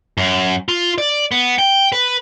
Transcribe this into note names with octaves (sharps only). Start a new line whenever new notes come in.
F#2
F4
D5
B3
G5
B4